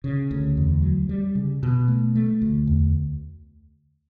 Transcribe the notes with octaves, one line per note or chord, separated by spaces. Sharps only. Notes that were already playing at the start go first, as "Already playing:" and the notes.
C#3
D2
E2
F#3
G3
C#3
B2
A3
A3
D2
E2